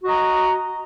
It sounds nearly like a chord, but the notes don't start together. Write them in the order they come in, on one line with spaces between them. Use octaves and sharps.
F#4 D#5 A#5